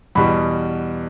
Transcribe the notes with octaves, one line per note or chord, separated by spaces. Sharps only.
E2 B2 G3 B5